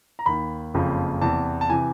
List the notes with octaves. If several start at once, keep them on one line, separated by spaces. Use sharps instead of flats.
A#5
D#2 D#3 B5
F#1 F2 C#3 F3
E2 C3 E3 A5
A5
C3 E3 G#5